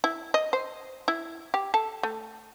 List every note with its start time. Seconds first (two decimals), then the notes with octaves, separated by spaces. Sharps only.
0.04 E4
0.34 D#5
0.53 C5
1.08 E4
1.54 G4
1.74 A4
2.03 A3